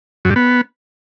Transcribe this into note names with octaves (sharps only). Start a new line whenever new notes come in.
F#2
G2
B3